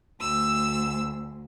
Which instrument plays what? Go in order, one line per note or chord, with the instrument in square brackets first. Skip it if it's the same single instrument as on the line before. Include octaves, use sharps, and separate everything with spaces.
[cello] D2 [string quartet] E6